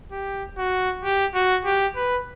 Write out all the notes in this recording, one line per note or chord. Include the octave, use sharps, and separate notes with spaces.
G4
F#4
G4
F#4
G4
B4